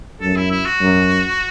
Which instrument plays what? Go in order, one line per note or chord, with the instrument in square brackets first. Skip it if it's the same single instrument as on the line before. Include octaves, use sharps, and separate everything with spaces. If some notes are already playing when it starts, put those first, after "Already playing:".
[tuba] F#2 [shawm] A4
[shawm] E4
E4
F#4
[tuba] F#2